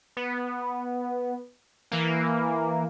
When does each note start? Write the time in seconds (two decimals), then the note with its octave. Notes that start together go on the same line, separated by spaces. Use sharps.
0.17 B3
1.92 E3 A#3